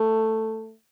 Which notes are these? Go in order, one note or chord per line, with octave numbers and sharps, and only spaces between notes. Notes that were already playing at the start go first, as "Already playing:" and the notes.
Already playing: A3